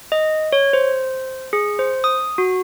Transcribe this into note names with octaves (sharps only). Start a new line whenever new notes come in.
D#5
C#5
C5
G#4
C5
D#6
F#4